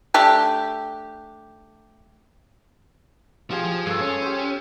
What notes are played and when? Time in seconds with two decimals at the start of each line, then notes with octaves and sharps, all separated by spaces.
0.14 A3 D4 G4
3.51 F3 F4 G4 G#4
3.65 F3
3.86 G2 G#4 A4
4.01 C#4
4.22 G4 C5